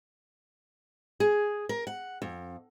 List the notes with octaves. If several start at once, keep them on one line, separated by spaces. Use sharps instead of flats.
G#4
A#4
F#5
F2